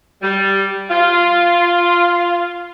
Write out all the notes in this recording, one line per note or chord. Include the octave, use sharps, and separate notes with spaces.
G3
F4